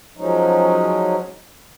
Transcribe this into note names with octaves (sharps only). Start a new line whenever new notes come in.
F3 F#3 G#3 C#4 D#4